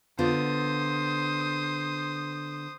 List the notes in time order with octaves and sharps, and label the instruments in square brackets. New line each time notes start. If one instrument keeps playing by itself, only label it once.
[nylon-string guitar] D3 B3 F4 [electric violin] C5 D#6